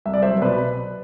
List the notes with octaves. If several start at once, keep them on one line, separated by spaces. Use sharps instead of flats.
C2 E5
D5
F#3 C5 E5
B2 B4 D5